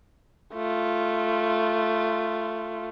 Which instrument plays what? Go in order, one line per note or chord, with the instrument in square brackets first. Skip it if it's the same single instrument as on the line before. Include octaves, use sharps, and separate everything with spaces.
[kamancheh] A3 F4